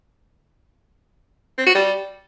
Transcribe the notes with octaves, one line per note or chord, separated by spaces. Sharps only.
C4
F#4
G3